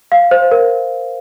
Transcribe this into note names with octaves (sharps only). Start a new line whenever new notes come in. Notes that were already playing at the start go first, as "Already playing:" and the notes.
F5
C5
A#4